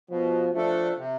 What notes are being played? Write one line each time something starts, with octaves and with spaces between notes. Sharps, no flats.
B2 F3
F3 A3 D4 A4
C3